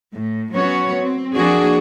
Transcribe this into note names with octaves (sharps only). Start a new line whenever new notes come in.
A2
F#3 B3 C#4 F#4 C#5
C4
F3 A#3 D4 F#4 G#4